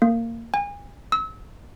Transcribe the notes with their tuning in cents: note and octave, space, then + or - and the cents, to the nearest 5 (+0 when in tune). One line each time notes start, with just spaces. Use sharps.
A#3 -20
G#5 -35
E6 -30